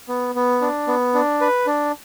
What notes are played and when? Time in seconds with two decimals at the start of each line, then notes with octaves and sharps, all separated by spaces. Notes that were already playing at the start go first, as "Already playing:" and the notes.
0.08 B3
0.35 B3
0.62 D4
0.87 B3
1.14 D4
1.41 B4
1.67 D4